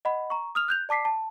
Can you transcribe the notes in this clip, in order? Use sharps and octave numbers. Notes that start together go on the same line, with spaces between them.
D#5 F#5 B5
A#5 C#6
D#6 F6 F7
F#6 G6 F7
D5 A5 D6 B6 C7
A5